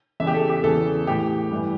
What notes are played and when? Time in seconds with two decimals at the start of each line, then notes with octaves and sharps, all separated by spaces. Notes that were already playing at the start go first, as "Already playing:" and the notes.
0.20 E2 C#3 E3 E5
0.27 G4
0.34 A4
0.49 G4
0.63 E2 C#3 E3 A4
1.07 A2 E3 G4
1.51 G2 E3